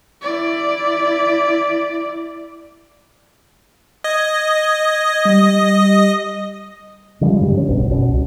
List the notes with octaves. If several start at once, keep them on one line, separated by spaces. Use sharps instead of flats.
E4 D5
D#5 G#6
G3
C#3 F3 G3 G#3
G2 D3 F3 G3
C4 C#4
D1 B1 G2
F#1 B2 C#4
C2